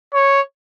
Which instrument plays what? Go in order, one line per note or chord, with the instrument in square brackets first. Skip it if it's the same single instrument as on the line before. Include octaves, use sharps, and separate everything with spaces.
[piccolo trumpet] C#5